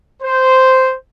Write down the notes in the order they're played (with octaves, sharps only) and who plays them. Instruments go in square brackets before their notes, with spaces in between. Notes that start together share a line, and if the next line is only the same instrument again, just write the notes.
[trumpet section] C5